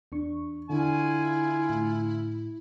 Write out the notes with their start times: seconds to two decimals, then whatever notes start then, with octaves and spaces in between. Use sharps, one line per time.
0.12 E2 D4 C#6
0.69 D3 E4 F4 G#5
1.70 A2